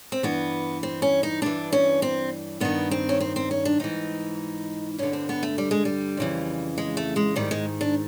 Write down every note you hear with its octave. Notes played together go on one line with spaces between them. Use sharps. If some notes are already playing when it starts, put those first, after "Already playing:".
C4
G2 E3 B3
C4
C#4
D#4
G2 E3 D4
C#4
C4
G2 D#3 B3
C4
C#4
C4
C4
C#4
D4
G#2 E3 D#4
G2 D3 C#4
C4
B3
A3
G3
G#3
G3
F2 C#3 E3
G#3
A3
G#3
G#2 D#3 G3
G#3
D4